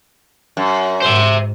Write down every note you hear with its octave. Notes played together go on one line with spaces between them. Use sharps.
F#2
G#2 C5 E5